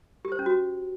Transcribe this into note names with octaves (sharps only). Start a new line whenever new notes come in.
G4
C5
C#4
F#4